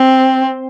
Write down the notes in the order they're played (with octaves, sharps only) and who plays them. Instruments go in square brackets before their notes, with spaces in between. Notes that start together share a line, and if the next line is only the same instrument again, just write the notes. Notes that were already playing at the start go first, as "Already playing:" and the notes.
Already playing: [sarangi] C4